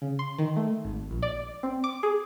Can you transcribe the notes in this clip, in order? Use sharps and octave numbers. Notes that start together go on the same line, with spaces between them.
C#3
C6
D#3
A3
G#1
A#1
D5
C4
D6
G#4